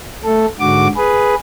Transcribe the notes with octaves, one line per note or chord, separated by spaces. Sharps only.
A3 A4
G#2 D3 F#4 D6
G#4 B4